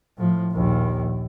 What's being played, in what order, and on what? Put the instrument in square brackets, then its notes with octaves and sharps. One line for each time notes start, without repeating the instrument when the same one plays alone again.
[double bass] A2 F3
A#1 D#2